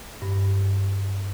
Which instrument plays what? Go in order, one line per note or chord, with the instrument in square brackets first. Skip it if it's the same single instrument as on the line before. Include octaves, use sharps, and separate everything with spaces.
[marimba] G2